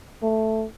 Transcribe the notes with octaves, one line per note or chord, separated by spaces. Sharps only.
A3